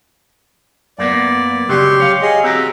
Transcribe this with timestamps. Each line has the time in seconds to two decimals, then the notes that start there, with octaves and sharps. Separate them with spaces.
0.98 F#2 A#3 B3 D5
1.69 C#2 C#3 F#3 G4 C6 C#6
2.00 C#5 F5
2.22 G#4 D#5
2.44 C4 F#4 G4 A#5